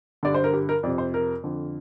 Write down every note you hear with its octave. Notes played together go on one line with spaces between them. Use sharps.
G2 D3 D5
C5
A#4
G4
A#4
F2 C3 D5
C5
A#4
F2 D3